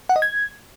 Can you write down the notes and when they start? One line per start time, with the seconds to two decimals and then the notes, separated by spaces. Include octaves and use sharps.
0.09 F#5
0.16 D#5
0.22 G#6